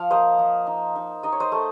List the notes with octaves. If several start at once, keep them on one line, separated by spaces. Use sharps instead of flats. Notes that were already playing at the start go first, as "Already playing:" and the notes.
Already playing: F3 F5
A#3 C5 D#5
F3
D#4
D#4
D#4 D#5
C#5
C5 D#5
A3